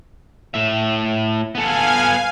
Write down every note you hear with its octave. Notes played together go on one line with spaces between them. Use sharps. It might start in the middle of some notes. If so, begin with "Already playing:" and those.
A2 E5
B3 A4 F5 G#5